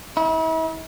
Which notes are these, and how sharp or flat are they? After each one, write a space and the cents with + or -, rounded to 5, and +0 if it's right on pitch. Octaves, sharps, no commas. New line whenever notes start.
E4 -40